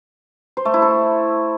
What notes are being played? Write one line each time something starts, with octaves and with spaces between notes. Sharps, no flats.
C5
A3
E4
A4